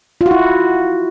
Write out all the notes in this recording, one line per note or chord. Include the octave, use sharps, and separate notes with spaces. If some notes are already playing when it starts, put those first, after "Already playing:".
F4
F#4
E4